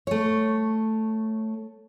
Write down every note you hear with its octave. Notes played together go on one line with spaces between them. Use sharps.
A3 C#5